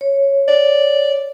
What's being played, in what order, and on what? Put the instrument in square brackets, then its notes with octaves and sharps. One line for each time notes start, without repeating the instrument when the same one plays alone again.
[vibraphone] C#5
[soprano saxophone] D5